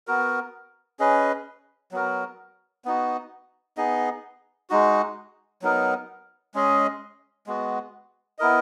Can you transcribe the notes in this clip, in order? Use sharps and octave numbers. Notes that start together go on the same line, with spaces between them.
B3 F#4 A#4
C#4 G#4 B4 D#5
F#3 B3 F#4 A#4
B3 D#4 F#4
B3 D#4 G#4 D#5
G#3 D#4 F#4
F#3 B3 D#4 A#4
G#3 C#4 G#4 D#5
G#3 B3 F#4
B3 E4 A#4 D#5